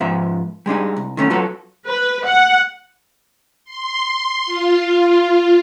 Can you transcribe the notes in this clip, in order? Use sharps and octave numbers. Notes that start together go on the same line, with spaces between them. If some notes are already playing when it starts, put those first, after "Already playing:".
G#2 F3 B3 E5
G3 G#3 D4 D#4
C2
D#3 A3 C#4
F#3 F4 F#4 A4 B4 C#5
B4
F#5
C6
F4